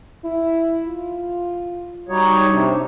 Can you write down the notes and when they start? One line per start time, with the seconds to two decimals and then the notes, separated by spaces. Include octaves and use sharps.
0.25 E4
0.88 F4
2.09 G3 D#4 F#4 C#5
2.50 C3 D4